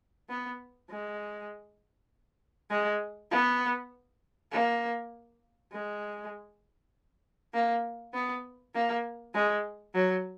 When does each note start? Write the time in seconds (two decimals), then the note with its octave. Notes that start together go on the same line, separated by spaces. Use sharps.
0.29 B3
0.90 G#3
2.70 G#3
3.31 B3
4.52 A#3
5.73 G#3
7.53 A#3
8.13 B3
8.74 A#3
9.34 G#3
9.94 F#3